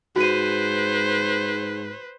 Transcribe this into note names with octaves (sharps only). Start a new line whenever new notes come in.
G#2 F#4 B4 C5 D#7